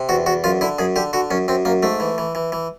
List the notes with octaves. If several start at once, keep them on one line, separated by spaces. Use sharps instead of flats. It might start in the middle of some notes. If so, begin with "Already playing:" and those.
Already playing: C3
E2 F#4
E2 F#4
F#2 F4
D3 E4
F#2 G#4
D3 G4
D3 F#4
F#2 C#4
F#2 C4
F#2 A#3
G#2 A3
E3
E3
E3
E3